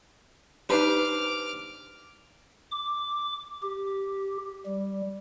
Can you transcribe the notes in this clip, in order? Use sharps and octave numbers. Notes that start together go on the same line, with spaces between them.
D4 D#4 G4 B4 C5 D6 F6
D6
G4
G3